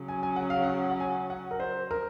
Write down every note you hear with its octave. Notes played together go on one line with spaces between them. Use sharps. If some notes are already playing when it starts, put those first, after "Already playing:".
Already playing: C#3 F#3 C#4
G#5
G#5
F#5
F5
F#5
F#5
G#5
F#5
A#4
C5
A#4